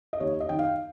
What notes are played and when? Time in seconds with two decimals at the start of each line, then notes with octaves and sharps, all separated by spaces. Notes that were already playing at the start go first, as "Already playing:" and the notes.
0.13 D#5
0.20 D#2 C#5
0.40 D#5
0.49 D#3 G5
0.59 F5